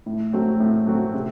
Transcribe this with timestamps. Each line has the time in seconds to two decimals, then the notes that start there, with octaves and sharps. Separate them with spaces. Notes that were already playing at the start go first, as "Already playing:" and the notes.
0.06 A2
0.33 F#3 A3 C4 F#4
0.60 A2
0.87 F#3 A3 C4 F#4
1.14 C3